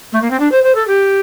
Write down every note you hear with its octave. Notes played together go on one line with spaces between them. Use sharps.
A3
A#3
C4
D4
C5
C5
A4
G4